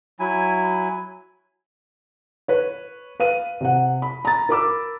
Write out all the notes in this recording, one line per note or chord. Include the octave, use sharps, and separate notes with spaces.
F#3 E4 G#5
B4 C#5
B4 F5 D#7
C3 F#5
B5
A#5 A6
A#4 B5 D6 E6